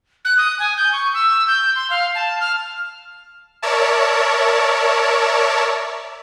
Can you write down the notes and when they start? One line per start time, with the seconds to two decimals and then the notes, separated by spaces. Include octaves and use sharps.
0.25 F#6
0.38 D#6
0.59 G#5
0.77 G6
0.93 C#6
1.14 E6
1.48 G6
1.76 C6
1.90 F5
2.15 A5
2.40 F6
3.62 A#4 C#5 D5 E5 A5